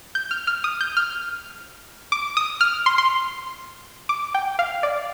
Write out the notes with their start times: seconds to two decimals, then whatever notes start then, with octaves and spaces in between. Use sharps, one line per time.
0.15 G6
0.31 F6
0.47 F6
0.64 D#6
0.81 G6
0.97 F6
2.12 D6
2.37 D#6
2.61 F6
2.86 C6
2.98 C6
4.09 D6
4.34 G5
4.59 F5
4.83 D5